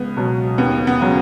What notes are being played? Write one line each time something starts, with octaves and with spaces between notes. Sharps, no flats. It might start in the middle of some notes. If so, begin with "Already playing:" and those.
Already playing: C#2 B3
B2 F#3
D#2 B3
B3
C#3 F#3